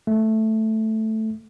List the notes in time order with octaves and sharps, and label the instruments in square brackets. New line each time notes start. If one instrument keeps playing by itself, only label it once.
[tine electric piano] A3